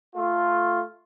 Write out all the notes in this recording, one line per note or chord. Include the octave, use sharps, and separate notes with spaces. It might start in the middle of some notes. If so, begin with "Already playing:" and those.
A3 F4